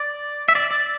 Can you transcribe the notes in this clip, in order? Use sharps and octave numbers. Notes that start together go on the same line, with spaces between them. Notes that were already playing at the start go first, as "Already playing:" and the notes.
Already playing: D5
E5
D5
D5